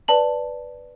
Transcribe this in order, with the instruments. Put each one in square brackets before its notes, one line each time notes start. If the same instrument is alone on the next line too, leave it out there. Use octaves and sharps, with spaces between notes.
[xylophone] B4 D5 A5 F#7